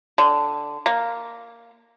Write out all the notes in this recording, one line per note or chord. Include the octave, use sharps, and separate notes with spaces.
D3
A#3